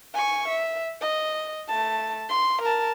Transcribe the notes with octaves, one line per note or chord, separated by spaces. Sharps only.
G#5 C#6
E5
D#5
A3 A5
C6
A#4 A5